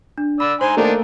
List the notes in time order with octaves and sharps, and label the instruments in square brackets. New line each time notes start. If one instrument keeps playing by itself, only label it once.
[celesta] D4
[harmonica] D5 E6 [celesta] B5
[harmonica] D#4 G#5 C6 [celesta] C5
[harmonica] D#3 D4 D#4 [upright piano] A3 A#3